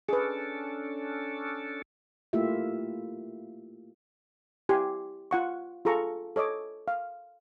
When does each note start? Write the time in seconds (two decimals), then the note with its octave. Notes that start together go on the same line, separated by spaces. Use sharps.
0.09 C#4 D4 G#4 A4 B4
2.33 A3 A#3 E4 F4 G4 E5
4.69 E4 G4 G#5 C6
5.31 F4 F#5 C#6
5.85 F4 G#4 A4 A#5 C#6
6.36 A4 C#5 D#5 D6
6.88 F5